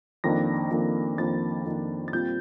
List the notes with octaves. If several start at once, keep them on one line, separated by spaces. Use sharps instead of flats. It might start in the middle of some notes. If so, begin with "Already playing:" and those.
F2 D#3 A#3 D4 A#6
F2 D#3 A#3 D4
F2 D#3 A#3 D4 A6
F2 D#3 A#3 D4
A6
A#2 G3 C4 F4 G6